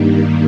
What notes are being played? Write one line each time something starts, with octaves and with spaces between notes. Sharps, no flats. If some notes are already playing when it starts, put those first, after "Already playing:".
Already playing: G2 D#3 G3 A#3